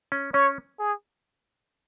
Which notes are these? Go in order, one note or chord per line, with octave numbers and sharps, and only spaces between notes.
C#4
C#4 C#5
G#4